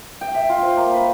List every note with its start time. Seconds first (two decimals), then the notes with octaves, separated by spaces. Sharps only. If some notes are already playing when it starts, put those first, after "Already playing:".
0.21 G5
0.34 E5
0.49 F4
0.62 C5
0.77 A#3
0.94 B4